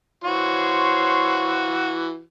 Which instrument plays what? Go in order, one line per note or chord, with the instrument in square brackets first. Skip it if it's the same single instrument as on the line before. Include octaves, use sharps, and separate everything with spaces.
[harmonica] E3 F#4 [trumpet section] C5 C#5 C6